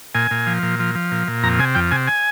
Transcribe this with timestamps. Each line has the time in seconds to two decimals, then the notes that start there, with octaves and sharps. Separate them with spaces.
0.15 A#2 G#5
0.31 A#2
0.47 F3
0.63 A#2
0.79 F3
0.95 F3
1.11 A#2
1.27 A#2
1.43 F2 A#5
1.59 C3 G#5
1.75 F2 G5
1.91 C3 G#5
2.07 G#5